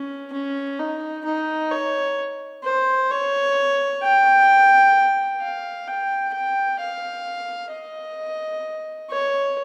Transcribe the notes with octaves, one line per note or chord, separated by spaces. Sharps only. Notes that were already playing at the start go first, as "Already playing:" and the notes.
Already playing: C#4
C#4
D#4
D#4
C#5
C5
C#5
G5
F5
G5
G5
F5
D#5
C#5